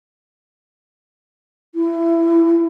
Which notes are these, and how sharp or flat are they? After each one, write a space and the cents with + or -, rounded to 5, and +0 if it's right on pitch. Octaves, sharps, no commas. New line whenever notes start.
E4 +20